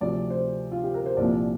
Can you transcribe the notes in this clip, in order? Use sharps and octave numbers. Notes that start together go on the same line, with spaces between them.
D2 C3 F3 D5
C5
F4
G4
A#4
C5
C2 A#2 F3 D5